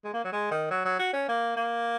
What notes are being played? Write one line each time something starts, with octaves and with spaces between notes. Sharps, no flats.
G#3
A#3
F#3
G#3
D#3
F#3
F#3
F#4
C#4
A#3
A#3